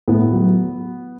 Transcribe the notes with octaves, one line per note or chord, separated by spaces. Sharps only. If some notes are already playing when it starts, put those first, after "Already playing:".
A2 B3
F#3